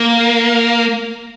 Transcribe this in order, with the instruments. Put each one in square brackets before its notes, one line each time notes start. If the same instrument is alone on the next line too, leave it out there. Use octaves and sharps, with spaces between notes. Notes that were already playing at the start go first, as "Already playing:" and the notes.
Already playing: [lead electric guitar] A#3